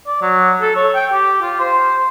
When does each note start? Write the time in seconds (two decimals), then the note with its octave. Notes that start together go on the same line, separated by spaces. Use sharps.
0.07 D5
0.22 F#3
0.62 A4
0.76 C#5
0.95 G5
1.12 G4
1.42 F4
1.60 C5